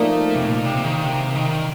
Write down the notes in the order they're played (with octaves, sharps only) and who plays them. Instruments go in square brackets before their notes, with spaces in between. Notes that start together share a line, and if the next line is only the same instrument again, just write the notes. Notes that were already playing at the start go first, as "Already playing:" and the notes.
Already playing: [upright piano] F3 A#3 D#4 A#4 D5 [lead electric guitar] A3
[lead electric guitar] C3
A#2
C3
D#3
C3
D#3